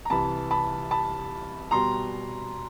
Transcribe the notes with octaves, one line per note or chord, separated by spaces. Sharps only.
A#5
C2 C3 E3 A5 B5
A5 B5
A5 B5
B2 G3 A#5 C6